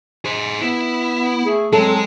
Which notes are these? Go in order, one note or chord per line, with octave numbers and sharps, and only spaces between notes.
G#4 C5
B3 E4
A3 G#4
F#3 G#3 C4 A4